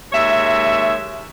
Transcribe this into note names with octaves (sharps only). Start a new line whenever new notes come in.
D#2 G#3 C#5 E5